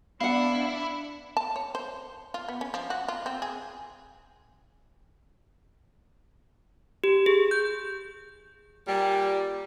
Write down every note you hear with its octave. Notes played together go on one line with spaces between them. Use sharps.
B3 D4 E4 F5 F#5
A5
C#5
C5
F4
B3
C#4
F3
F#4
F4
C4
G#4
G4
G#4
G6
A#2 G3